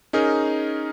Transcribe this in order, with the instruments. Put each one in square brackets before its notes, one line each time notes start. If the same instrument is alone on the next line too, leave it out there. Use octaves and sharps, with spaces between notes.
[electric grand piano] C#4 D#4 G#4 A#4